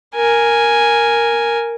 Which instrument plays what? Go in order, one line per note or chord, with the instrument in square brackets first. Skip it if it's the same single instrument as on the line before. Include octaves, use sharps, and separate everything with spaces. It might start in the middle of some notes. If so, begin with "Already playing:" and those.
[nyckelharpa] A#4 G#5